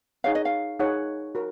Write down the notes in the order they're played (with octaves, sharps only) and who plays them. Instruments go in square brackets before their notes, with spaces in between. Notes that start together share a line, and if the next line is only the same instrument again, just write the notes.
[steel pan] D#4 G#4 C#5 F#5 [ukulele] F5
[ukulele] D#5
F5
[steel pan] D#4 G#4 C#5 F#5
F#4 A#4